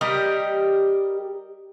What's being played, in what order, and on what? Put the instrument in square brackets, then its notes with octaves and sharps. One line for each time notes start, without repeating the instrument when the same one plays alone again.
[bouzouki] G3 G4 A#4 D#5